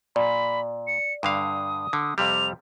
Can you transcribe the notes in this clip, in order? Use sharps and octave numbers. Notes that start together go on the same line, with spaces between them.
A#2 D5 B5
C#7
G2 D3 F5 D#6
D3
F2 C3 G3 F7